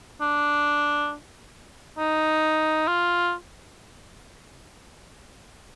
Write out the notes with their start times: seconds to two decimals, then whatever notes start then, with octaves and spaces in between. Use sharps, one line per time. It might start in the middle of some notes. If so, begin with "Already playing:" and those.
0.21 D4
1.98 D#4
2.88 F4